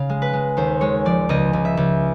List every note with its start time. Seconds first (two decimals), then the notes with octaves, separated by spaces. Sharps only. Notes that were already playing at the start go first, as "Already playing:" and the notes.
Already playing: C#3 F5
0.10 G#3
0.22 B4
0.33 G#3
0.57 D#2 C5
0.81 G#3 C#5
1.05 F3 D5
1.29 C#2 D#5
1.53 C#2
1.65 E5
1.77 C#2